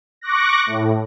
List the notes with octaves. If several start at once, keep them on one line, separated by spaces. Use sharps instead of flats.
C#6 D6 F#6 A#6
A2